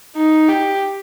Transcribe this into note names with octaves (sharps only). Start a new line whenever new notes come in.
D#4
G4